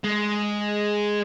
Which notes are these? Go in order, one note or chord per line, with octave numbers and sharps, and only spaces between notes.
G#3